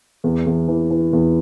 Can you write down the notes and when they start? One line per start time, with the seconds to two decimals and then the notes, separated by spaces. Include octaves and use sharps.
0.24 E2
0.46 E2
0.68 E3
0.91 E3
1.13 E2